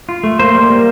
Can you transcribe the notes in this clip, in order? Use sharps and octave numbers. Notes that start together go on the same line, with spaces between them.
F4
A3
A#3 C5
G3
A#3